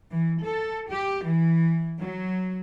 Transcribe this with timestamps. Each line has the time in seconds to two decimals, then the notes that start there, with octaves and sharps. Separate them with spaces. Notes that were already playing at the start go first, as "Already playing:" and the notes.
0.11 E3
0.43 A4
0.91 G4
1.26 E3
1.99 F#3